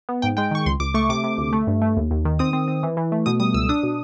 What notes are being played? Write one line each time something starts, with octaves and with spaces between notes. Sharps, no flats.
B3
G#2 G5
G#3 G5
D#3 C#6
C#2 C6
C#2 D6
A3 C#6
C3 D6
C3
D2
A3
G2
A3
D#2
D#2
D#3
C4 D#6
C4
C4
E3
E3
A3
B2 D#6
G3 D#6
C#2 E6
D4 D#6
B2